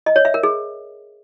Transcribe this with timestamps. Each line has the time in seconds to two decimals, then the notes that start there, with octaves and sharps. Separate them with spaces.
0.06 D#5
0.16 C#5
0.25 E5
0.34 A#4
0.43 G#4